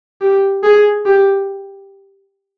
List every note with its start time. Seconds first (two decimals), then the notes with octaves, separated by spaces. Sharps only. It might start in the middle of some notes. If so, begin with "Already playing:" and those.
0.21 G4
0.64 G#4
1.06 G4